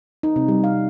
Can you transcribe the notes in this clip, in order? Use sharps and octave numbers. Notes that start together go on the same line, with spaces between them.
D#4
C3
G3
F5